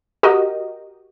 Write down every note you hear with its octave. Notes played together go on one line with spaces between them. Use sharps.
F#4 G4 A#4 D#5